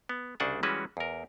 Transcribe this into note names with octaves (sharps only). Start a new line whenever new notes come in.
B3
C2 C#3 D4 C5 F#5 G#5
E3 G3 G#3 C#4 F#4 B4
E2 A#4